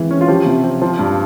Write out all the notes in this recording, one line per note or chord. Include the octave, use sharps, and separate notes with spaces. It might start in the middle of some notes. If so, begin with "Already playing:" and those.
Already playing: E3 G#3 C4
C#4
F4
F3 G4
C3
C4
F3
G2